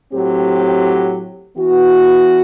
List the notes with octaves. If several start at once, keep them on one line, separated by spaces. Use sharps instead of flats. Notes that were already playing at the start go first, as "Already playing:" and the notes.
A2 F#3 C4 G4
E3 B3 F#4